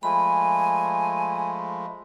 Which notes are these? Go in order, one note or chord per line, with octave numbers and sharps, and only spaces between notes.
F3 G#3 A3 G#5 B5